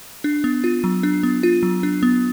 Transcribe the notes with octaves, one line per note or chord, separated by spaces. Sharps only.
D4
B3
F4
F#3
D4
B3
F4
F#3
D4
B3